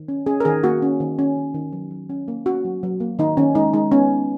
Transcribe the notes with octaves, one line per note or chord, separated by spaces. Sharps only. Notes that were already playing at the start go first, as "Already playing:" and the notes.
Already playing: D#3
C#4
C#4 G#4
A#4
D#3 G#4
A#3 F#4
C#4
D#3
C#4
D#3
D#3
F#3
F#3
C#4
A#3
C#4 F#4
F#3
F#3
A#3
D#3 D#4
D#3 C#4
G#3 D#4
G#3 D#4
B3 C#4
G#3